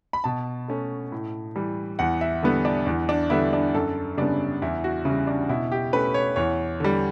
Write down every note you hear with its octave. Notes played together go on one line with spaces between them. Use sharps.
B5
B2 A5
A3 C#4
A2
E3 G3
E2 F#5
E5
D3 G3 B3
D4
E2
D4
D3 G3 B3 E4
D4
F#2 A4
C#3 G3 B3 D4
E2 E4
F#4
C#3 E4
G3
D4
B2 E4
G4
A3 C#4 B4
C#5
E2 C#5
D3 G3